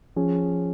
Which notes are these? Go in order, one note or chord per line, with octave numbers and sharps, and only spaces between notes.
F3 C#4 G#4